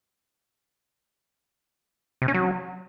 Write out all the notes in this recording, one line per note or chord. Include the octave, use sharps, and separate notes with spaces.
C3
C#4
F#3